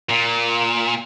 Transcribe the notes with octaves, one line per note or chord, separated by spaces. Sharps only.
A#2